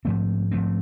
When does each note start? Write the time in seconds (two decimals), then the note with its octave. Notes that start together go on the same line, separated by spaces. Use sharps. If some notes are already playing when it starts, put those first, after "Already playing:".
0.05 G#2 F3 A3 C4
0.51 G#2 F3 A3 C4